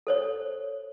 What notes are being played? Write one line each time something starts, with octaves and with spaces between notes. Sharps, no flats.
A4 C5 C#5